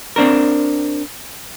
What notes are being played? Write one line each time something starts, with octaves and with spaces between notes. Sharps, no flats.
C4 D4 A#4